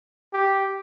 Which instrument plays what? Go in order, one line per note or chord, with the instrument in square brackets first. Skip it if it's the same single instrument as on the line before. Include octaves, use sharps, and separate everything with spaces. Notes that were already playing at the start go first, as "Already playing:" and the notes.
[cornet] G4